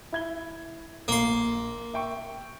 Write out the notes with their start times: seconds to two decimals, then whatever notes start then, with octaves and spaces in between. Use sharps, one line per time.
0.12 E4 G#6 G7
1.08 A#1 A#3 C6
1.94 E5 G5 C#6